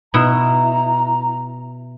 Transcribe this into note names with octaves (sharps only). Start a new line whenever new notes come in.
B2 E4 A#5